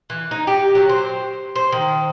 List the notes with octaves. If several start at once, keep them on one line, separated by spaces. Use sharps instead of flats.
E3
D#4
G4
F#3
C5
C5
D#3